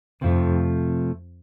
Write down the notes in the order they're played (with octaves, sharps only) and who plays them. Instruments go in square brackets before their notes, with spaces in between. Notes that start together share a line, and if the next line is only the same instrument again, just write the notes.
[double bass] F2 [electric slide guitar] C3 F3 A3